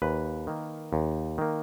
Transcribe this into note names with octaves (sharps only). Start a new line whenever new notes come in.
D#2 B4
D#3 A#3
D#2
D#3 A#3